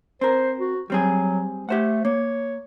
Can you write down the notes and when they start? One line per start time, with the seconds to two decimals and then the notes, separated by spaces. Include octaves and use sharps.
0.21 C4 A#4 C5
0.59 F#4
0.90 F#3 G3 C4 G#4
1.69 A3 G4 C5 F#5
2.05 A#3 C#5